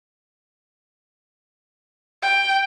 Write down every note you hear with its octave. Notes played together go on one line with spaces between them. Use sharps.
G5